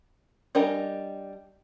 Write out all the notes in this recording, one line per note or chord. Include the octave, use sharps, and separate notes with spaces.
G3 D4 A#4 D#5 G#5